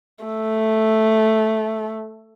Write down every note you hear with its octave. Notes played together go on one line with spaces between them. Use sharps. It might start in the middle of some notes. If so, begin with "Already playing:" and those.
A3